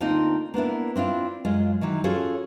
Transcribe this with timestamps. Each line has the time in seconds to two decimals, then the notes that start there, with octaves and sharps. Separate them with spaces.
0.01 D2 A#3 C4 D#4 F4 D#5
0.54 A#3 B3 D4 E4
0.96 C4 D4 E4 F4
1.45 F#2 G#3 F4 D#5
1.81 D#3 E3 F#3
2.04 C#4 F4 F#4 G#4 A4 C#5